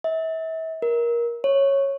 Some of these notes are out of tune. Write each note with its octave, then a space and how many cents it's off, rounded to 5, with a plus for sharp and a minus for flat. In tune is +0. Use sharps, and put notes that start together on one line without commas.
E5 -35
A#4 +20
C#5 -5